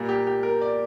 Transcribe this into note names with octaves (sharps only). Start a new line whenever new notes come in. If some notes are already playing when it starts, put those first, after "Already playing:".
Already playing: A#2 G3 A#3
G4
G4
A#4
D5